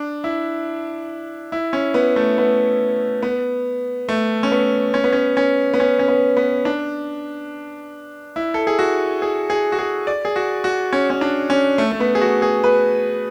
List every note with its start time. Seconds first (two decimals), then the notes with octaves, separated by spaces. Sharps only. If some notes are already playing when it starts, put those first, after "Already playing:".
Already playing: D4
0.24 E4
1.52 E4
1.73 C#4
1.94 B3
2.16 A3
2.38 B3
3.23 B3
4.09 A3
4.43 C#4
4.52 B3
4.94 C#4
5.04 B3
5.13 C#4
5.37 C#4
5.74 B3
5.80 C#4
5.99 C#4
6.08 B3
6.37 B3
6.65 D4
8.36 E4
8.54 A4
8.67 G#4
8.79 F#4
9.22 G#4
9.50 G#4
9.72 F#4
9.79 G#4
10.07 D5
10.25 G#4
10.36 F#4
10.64 F#4
10.93 C#4
11.10 C#4
11.21 D4
11.50 C#4
11.78 A3
11.92 A3
12.00 B3
12.15 G#4
12.21 F#4
12.42 G#4
12.64 B4